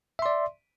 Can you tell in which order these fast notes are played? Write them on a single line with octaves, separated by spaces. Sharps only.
E5 C6 D5